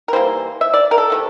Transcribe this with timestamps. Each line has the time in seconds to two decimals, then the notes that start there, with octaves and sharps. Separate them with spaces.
0.08 A#4
0.13 E3 G3 A#3 C5
0.61 E5
0.74 D5
0.91 A#4
0.98 A4
1.10 C3 F3 A3